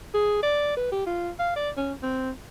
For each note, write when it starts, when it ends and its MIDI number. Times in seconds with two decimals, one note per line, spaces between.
0.14 0.42 68
0.43 0.74 74
0.76 0.91 71
0.92 1.05 67
1.06 1.29 65
1.39 1.52 77
1.56 1.70 74
1.77 1.93 61
2.03 2.31 60